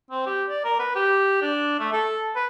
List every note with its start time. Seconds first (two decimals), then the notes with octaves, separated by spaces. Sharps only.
0.11 C4
0.26 G4
0.49 D5
0.65 A#4
0.80 B4
0.95 G4
1.42 D4
1.80 A3
1.93 A4
2.36 B4